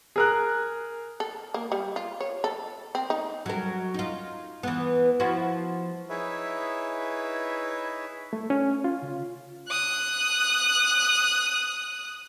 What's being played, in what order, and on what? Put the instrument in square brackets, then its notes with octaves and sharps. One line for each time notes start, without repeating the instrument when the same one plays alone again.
[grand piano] G#4 A#4 F#6
[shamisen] A4
A#3
G3
F4
C#5
A4
C4
D#4
[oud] F#3 A#4
D#4 F4
E3 B3
F3 E4 F#4
[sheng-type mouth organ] D#4 E4 G#4 B4 C#5 E5
[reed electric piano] A3
C#4
F4
C#3
[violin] D#6 F#6